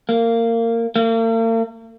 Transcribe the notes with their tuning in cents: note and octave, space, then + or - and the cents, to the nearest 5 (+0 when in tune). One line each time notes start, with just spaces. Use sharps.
A#3 -20
A#3 -45